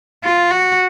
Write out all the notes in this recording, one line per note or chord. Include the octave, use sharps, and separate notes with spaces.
F4
F#4